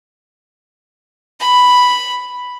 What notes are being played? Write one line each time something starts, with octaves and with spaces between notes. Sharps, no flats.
B5